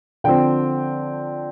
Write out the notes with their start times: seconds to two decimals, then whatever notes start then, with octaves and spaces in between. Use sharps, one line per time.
0.24 D3 F3 C4 G5